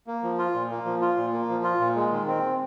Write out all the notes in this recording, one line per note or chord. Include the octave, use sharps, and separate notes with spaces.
A#3
F3
F4
A#2
A#3
F3
F4
A#2
A#3
F3
F4
A#2
G#3
D#3
C4